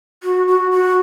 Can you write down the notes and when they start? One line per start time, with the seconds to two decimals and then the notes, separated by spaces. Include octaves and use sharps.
0.23 F#4
0.47 F#4
0.71 F#4